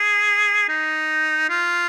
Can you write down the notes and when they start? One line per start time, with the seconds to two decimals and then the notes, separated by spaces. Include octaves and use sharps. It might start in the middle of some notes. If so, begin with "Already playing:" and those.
Already playing: G#4
0.69 D#4
1.49 F4